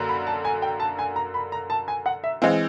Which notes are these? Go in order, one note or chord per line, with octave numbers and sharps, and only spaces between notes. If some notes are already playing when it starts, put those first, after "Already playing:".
Already playing: F#2 D3 A#3
B5
A5
G#5
G5
A5
G#5
A#5
B5
A#5
A5
G#5
F#5
E5
E3 G#3 C4 F5